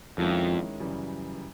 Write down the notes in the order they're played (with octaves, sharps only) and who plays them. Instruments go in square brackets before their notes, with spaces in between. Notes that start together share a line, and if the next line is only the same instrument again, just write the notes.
[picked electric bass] F2 [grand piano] D#3 G#3 C#4 E4
[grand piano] F#2 C#3 E3 G3